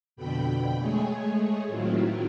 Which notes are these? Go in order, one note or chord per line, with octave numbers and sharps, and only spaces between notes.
F2 B2 D3 G5 B5
G#3 A3 G#4 C#5
A2 D#3 F#3 C4 E4 F4